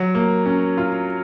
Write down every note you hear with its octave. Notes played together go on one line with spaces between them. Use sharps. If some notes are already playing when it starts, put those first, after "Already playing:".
Already playing: F#3
A#3
C#4
F4